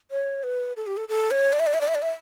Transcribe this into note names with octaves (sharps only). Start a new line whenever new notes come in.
C#5
B4
A4
G4
A4
A4
C#5
D5
E5
D5
E5
D5
E5
D5
E5